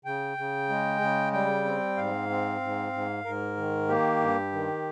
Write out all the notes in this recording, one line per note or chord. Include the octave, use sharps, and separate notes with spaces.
C#3 G5
C#3
G#3
C#3
G3 G5
C4
G#2 F5
C4
G#2
G#2
G#2 A#4
D#3
A#3 G4
G2
D#3